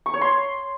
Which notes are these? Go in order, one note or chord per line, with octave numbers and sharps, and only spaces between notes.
C#6
C#5
C6